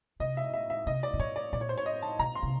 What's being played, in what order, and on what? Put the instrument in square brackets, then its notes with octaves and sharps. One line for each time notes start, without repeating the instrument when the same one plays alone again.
[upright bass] C3 [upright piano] D#5
[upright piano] E5
E5
E5
[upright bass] C3 [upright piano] D#5
[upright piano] D5
[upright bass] B2
[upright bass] A#2 [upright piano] C#5
[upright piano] D5
[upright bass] A#2 [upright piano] D5
[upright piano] C#5
C5
C#5
D#5
A5
[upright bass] B2 [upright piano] A#5
[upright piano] C6
[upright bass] C3